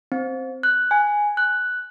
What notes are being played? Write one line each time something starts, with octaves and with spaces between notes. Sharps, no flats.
C4
F#6
G#5
F#6